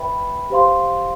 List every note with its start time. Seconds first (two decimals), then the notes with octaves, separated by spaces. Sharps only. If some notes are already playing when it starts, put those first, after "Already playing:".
Already playing: B4 E5 G5 B5
0.50 G4 C5 F5 C6